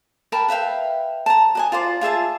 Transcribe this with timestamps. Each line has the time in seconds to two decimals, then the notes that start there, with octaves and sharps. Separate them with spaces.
0.32 A#4 G5 A5 B5
0.48 B4 E5 F5 G5
1.26 A5 A#5
1.55 F#4 D#5 G#5
1.72 F4 C5 D5
2.01 F4 G#4 E5 A5